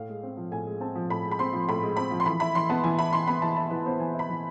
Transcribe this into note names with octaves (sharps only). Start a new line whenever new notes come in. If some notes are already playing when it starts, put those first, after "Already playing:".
Already playing: A2 F5
G#3
C4
F3
A2 G#5
G#3
C4 A5
F3
A2 B5
G#3
B5
C4 C6
F3
A2 B5
G#3
C4 B5
F3
C6
E3 B5
E4 B5
E3 C6
B3 A5
E3 G#5
E4 B5
E3 C6
B3 B5
E3 A5
E4 A5
E3 B4
B3 C5
E3 G#5
E4
B5
E3